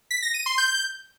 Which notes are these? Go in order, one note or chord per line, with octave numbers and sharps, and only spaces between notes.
B6
A#6
D#7
C6
G6